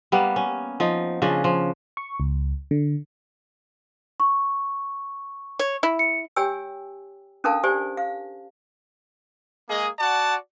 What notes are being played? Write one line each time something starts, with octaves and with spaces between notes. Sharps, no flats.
G3 A#3 B3
C#4
F3 D#4
C#3 F3 C#4 D4
F3
C#6
C#2
D3
C#6
C#5
E4
C#7
G4 C#5 G5 G#5 E6
C#4 D4 A4 A#4 F5 A5
G4 C5 D5 G#5
F5
G#3 A#3 G#4 D#5
F#4 D5 F#5 A5